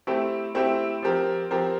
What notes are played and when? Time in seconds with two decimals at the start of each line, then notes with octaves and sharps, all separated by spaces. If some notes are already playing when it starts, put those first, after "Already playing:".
0.07 A3 C4 E4 G4
0.55 A3 C4 E4 G4
1.02 F3 C4 G4 A#4
1.51 F3 C4 G4 A#4